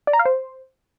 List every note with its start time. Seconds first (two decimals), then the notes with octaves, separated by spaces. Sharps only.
0.07 D5
0.13 A#5
0.19 F5
0.25 C5